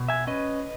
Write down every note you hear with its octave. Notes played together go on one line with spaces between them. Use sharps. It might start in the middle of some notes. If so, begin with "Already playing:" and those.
Already playing: B2
E5 G#5
C#4 B4 D#5